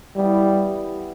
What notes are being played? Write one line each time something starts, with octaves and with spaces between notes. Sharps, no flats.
E3 G3 B3 E4 G4